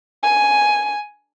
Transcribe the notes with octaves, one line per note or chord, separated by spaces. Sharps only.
G#5